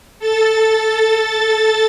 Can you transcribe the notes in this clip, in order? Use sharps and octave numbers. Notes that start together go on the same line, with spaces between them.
A4 A6